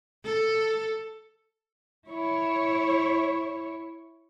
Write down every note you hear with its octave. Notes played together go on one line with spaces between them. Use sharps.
A4
E4 C#5